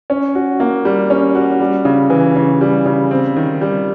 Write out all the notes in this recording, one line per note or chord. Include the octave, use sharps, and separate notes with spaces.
C#4
F#4
A#3
G3
C#4
F#4
G3
C#3
E3
C#3
G3
C#3
C4
D#3
G3